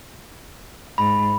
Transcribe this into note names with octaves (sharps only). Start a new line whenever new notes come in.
G#2 B5